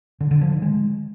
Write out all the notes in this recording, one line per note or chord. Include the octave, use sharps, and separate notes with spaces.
D3
D3
F3
D#3
G#3